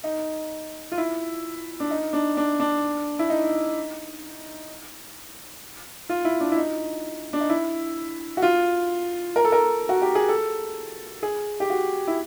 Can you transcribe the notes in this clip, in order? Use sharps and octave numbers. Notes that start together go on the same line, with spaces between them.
D#4
F4
E4
D4
D#4
D4
D4
D4
E4
D#4
F4
E4
D4
E4
D#4
D4
D#4
E4
F#4
F4
A#4
A4
A#4
F#4
G4
G#4
A4
G#4
G4
F#4
E4